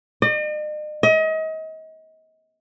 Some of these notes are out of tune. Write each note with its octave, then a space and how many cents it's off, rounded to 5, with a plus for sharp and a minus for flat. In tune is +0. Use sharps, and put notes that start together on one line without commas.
D#5 -45
D#5 +35